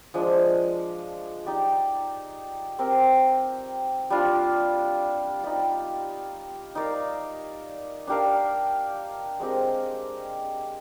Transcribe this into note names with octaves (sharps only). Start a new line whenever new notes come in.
F3 G#3 D4
D#4 G4 D5
C4 G4 A#4
G3 D4 F4
D#4 G4 D5
D#4 A#4 D5 F5
D4 G4 A#4 F5
G#3 C4 G4 A#4